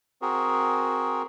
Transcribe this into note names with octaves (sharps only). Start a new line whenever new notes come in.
C4 F#4 G#4 A#4